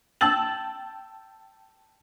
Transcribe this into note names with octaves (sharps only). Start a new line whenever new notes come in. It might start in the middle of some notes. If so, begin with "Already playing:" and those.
G5 A5 E6 A6 F#7